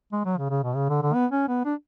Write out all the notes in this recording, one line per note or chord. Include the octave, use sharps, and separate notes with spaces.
G#3
F#3
C#3
C#3
B2
C#3
D3
D3
B3
C#4
B3
D4